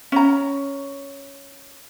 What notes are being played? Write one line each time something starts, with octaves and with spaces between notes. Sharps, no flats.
C#4 A#5